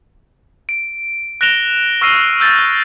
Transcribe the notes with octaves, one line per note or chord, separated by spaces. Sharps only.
D7
F#6 A#6 D7 E7 F7 G7
C#6 E6 F6 A#6 C7 D#7
E6 G6 A6